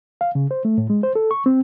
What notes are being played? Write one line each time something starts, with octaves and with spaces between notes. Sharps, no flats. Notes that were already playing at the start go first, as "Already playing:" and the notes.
F5
C#3
C5
A3
A2
G#3
C5
A4
C#6
C4